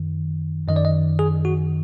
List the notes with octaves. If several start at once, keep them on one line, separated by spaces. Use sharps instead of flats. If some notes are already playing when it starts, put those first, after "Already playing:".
Already playing: F#2 D#3
F#2 D#3 D#5
D5
D#5
G#4
F#4